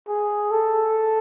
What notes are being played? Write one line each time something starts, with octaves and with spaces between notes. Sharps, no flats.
G#4
A4